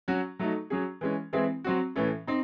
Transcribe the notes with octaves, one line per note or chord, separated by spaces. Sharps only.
F#3 C#4 F#4
F#3 A3 D#4
F#3 C#4 G#4
E3 G#3 C#4
E3 G#3 C4 E4 G#4
F#3 C4 F#4
A2 E3 A3 C#4
C4 D#4